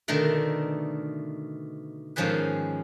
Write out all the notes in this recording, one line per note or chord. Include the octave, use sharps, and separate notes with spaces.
B2 D3 D#3 A3 A#4
G#2 D#3 F3 C#4 G#4 B4